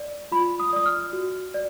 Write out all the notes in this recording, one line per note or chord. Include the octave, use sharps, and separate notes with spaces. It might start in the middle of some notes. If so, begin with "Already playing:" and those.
Already playing: D5
F4 B5
D#6
D5 D#6
F6
F#4
D5